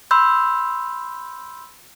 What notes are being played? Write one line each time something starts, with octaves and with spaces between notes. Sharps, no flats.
B5 C6 E6 G6